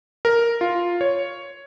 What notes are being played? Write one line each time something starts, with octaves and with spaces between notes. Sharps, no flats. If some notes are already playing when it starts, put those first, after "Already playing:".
A#4
F4
C#5